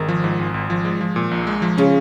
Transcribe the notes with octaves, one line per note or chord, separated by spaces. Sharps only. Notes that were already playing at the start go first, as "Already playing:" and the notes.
Already playing: G#1 D#3
F3
G#2
G#1
G#1
F3
G#3
F3
A#2
A#1
G#3
F3
C#3 C#4